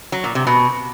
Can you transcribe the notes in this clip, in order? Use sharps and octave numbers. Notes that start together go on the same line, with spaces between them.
F#3
A#2
C3
B2